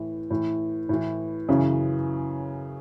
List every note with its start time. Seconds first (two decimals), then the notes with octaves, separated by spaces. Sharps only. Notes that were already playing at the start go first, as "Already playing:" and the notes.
Already playing: A2 E3
0.31 A2 E3
0.89 A2 E3
1.49 F#2 C#3 E3